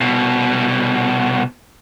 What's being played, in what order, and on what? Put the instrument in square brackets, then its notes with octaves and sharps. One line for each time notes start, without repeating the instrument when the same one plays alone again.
[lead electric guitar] C2 B2